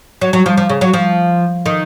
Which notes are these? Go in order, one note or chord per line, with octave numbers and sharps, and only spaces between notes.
F#3
F#3
F3
F3
C#3
F#3
F3
D#3